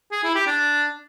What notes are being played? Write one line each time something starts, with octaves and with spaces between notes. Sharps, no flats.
G#4
E4
G4
D4